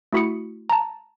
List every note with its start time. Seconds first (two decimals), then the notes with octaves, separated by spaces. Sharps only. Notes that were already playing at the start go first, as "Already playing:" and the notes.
0.13 A3 E4 F#4 B5 D#6 C#7
0.70 A5 A#5